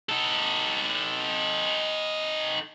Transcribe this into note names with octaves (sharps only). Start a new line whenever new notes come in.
D#4 A4